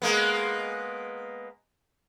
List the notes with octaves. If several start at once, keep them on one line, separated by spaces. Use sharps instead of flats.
G#3 A#3 B3